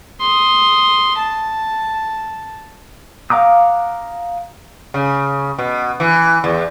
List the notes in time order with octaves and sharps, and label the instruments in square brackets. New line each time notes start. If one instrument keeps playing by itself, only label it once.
[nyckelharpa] C6 D#6
A5
[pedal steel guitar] F5 F#5 A#5 D6 D#6
[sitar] C#3
B2
E3
E2